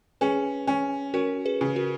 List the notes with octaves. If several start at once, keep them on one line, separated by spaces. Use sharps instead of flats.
C#4 G#4 B4
C#4
C#4 F#4 A#4
G#4 B4
C#3
F#4 A#4